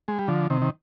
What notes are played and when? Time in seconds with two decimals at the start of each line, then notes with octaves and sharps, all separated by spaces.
0.08 G#3
0.19 G3
0.28 D3 F3
0.50 C3 D#3
0.62 D#3